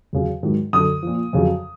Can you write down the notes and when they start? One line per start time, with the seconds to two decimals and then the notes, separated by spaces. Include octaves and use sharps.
0.13 E2 C#3 F#3
0.43 G#2 D#3 F#3
0.73 F#2 D3 F#3 D#6
1.03 A#2 F3
1.33 F2 C#3 F#3